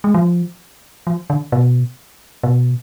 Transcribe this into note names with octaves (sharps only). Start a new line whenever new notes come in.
G#3
F3
F3
D3
B2
B2